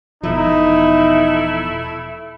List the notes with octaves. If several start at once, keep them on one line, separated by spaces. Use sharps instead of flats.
E1 B2 F3 A3 D#4 E4